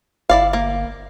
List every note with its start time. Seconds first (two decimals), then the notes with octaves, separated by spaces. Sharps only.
0.29 G1 E4 D5 F5
0.53 A#3